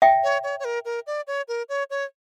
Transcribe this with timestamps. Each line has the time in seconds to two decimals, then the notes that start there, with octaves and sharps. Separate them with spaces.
0.02 E5 G5
0.23 C#5
0.43 C#5
0.60 C#5
0.65 A#4
0.85 A#4
1.07 D5
1.27 C#5
1.48 A#4
1.69 C#5
1.90 C#5